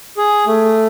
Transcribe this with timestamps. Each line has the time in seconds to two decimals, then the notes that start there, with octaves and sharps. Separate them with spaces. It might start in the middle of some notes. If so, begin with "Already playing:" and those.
0.17 G#4
0.47 A3